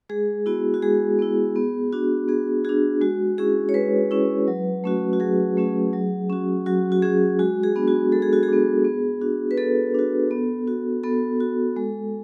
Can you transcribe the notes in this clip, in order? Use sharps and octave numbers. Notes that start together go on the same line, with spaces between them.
G#3 G#4
B3 E4 F#4
F#4
G#3 G#4
B3 E4
B3
D4 F#4
B3 G#4
D4 F#4 G#4
G#3 F#4
C#4 E4 G#4
C#5
G#3 B4
C#4 E4
F#3
A3 C#4 F#4
F#4
F#3 G#4
A3 C#4 F#4
F#3
C#4 F#4
F#3 F#4
F#4
C#4 F#4 G#4
G#3 F#4
G#4
B3 D4
F#4
G#3 A4
G#4
F#4
G#4
B3 D4
B3
D4 F#4
B4
B3 A4
D4 F#4
B3
F#4
B3 A4
F#4
G#3